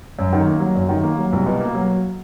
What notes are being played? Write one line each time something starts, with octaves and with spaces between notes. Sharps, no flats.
F#2
D#3
A#3
F#3
F#2
D#3
A#3
F#3
C2
B2
A#3
F#3